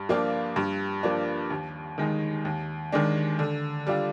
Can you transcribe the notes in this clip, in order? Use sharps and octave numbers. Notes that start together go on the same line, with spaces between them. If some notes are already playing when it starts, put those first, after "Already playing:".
Already playing: G2
F3 A#3 D4 F4
G2
F3 A#3 D4
D#2
D#3 G#3 D#4
D#2
D#3 G#3 D4
D3
G3 D4 F4